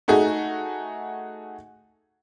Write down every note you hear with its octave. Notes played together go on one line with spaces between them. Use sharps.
A3 D#4 F#4 G#4